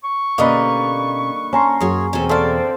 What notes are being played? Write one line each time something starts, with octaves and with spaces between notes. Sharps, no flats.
C#6
B2 D3 G3 A#3 C#4 D#4 B4 D#5
C#4 A5 A#5 C6
F#2 F#4 G#4 C#5
E2 B2 C4 C#4 G#4 A4
D3 A4 C5 D5 F5